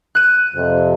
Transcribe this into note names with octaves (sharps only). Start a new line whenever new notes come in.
F#6 D#7
F2 C3